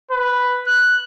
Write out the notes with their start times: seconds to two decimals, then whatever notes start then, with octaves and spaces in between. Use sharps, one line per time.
0.11 B4
0.66 F#6